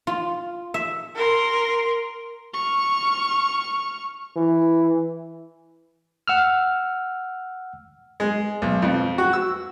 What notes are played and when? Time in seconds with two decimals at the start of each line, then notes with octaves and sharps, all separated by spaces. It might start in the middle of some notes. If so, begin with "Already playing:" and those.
0.07 F4
0.74 E5
1.16 A#4 C6
2.53 C#6 F6
4.36 E3
6.28 F#5 E6 F6
8.20 G#3
8.62 B1
8.82 F2
9.18 F#4
9.33 E6